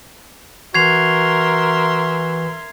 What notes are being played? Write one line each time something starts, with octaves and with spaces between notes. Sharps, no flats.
E3 F#4 A#4 E5 C6 G#6 C7 F7